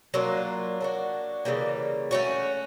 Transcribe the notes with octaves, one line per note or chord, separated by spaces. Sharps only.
F#3 A#3 D4 F4
A#3 D4 F#4
C#3 E3 G3 A#3
A3 C#4 F#4